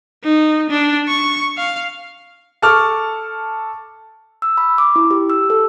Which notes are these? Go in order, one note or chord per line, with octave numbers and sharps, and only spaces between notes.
D#4
D4
C#6
F5
A4 A5 C#6 D6 F6
E6
B5
D6
E4
G4
E6
A4